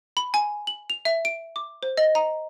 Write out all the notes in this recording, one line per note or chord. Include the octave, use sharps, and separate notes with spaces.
B5
G#5
F#7
F7
E5
D7
D6
C5
D#5
A#5